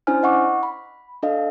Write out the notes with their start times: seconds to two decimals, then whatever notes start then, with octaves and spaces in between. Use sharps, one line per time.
0.07 C#4 D4 E4 C5 G#5 F6
0.23 D#5 F#5 C#6 D6
0.63 B5
1.23 D4 A4 D#5 F5